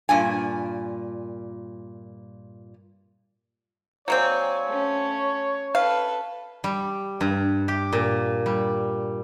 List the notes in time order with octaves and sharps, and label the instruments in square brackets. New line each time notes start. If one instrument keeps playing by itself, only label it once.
[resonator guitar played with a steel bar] G2 A#2 G#5
[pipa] F#3 A#3 C4 [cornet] C#5 [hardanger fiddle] D5 G#5
[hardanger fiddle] A3 C#4
[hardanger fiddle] A4 B4 [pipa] F5
[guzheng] G3
G2
G4
A#2
G3